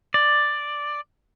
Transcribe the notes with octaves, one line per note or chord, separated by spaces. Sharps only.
D5